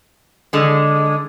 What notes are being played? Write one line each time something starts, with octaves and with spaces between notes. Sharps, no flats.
D3 G#3